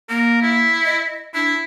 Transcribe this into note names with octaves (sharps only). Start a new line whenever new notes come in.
A#3 A#4
E4
D#5
D4 E4